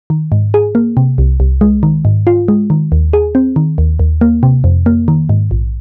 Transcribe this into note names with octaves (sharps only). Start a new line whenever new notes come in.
D#3
G#2
G#4
A#3
C3
C2
C2
G#3
D#3
G#2
F4
G#3
D#3
D#2
G#4
C4
D#3
D#2
D#2
A#3
C3
F2
A#3
D#3
G#2
A#1